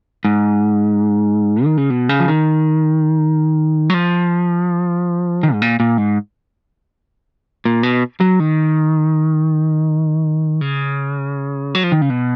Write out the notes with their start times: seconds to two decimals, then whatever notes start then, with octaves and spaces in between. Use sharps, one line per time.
0.25 G#2
1.64 D#3
1.77 C#3
1.90 B2
2.09 C#3
2.20 F3
2.28 D#3
3.90 F#3
3.94 F3
5.43 D#3
5.53 G#2
5.62 A#2
5.80 A#2
5.98 G#2
7.65 A#2
7.83 B2
8.20 F#3
8.40 D#3
10.61 C#3
11.75 F#3
11.84 F3
11.92 D#3
12.02 C#3
12.10 B2